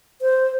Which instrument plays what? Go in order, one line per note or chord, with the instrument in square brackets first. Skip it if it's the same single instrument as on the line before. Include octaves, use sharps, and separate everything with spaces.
[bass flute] C5